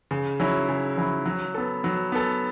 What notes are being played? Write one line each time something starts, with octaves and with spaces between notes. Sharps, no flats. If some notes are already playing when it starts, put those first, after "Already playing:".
C#3
F#3 C#4 E4
C#3
F#3 C#4 E4
F#3
B3 A4
F#3
B3 A4